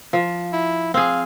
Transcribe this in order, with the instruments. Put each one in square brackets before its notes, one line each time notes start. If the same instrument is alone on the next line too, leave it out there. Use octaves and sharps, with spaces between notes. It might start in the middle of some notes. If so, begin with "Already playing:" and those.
[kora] F3
[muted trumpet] E4
[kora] C4 G#4 [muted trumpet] F5